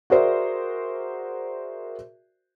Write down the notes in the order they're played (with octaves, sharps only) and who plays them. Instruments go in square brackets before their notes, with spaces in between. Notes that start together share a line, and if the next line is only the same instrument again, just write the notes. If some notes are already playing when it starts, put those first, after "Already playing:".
[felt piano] F#4 G#4 A#4 C5 D5 E5